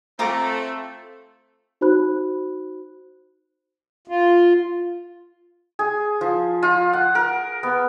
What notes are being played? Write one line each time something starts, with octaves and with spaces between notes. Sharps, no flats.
A3 C4 F4 A4 A#5 D6
D#4 F#4 C5 B5 F#6
F4
G#4
F3
F4
F#5
A#4
B3